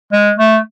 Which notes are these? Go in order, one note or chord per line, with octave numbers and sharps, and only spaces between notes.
G#3
A3